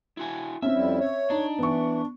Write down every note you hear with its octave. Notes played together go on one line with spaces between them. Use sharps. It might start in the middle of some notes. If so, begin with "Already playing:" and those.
E4 F#4 G#5
C4 C#4 E5
F2 G3 E4
C#5
D4 D#4
E3 B3 C#6